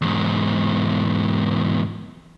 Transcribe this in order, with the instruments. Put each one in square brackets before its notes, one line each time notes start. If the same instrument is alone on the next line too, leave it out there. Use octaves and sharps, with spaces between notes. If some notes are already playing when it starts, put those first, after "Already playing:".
[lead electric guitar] E2 G#2